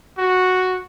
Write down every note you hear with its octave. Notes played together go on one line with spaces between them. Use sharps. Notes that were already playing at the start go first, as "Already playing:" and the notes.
F#4